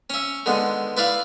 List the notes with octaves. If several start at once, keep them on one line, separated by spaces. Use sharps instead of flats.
C#4 E5
D3 D#3 G#3 B3
E4 B4 D5 E5 F5